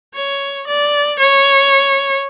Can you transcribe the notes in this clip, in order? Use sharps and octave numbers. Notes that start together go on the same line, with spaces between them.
C#5
D5
C#5